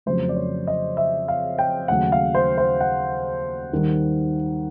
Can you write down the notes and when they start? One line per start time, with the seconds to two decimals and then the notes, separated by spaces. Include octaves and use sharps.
0.06 F2 C#3 F#3 A3 C5
0.29 D5
0.36 C#5
0.67 D#5
0.97 E5
1.28 F5
1.59 G5
1.88 D#2 C#3 F#3 A3 F#5
2.12 F5
2.35 C5
2.58 C5
2.81 F#5
3.72 D#2 D#3 G3